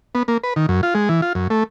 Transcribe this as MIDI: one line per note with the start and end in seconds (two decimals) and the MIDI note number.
0.15 0.23 59
0.28 0.38 58
0.44 0.54 71
0.56 0.66 51
0.69 0.81 42
0.83 0.94 65
0.95 1.09 56
1.09 1.21 52
1.22 1.33 65
1.35 1.48 42
1.50 1.64 57